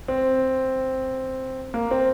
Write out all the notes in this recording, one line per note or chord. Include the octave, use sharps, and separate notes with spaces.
C4
A#3
C4